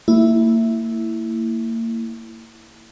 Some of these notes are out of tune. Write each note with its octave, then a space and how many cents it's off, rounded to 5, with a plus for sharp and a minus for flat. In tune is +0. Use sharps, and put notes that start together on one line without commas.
A#3 -35 E4 +0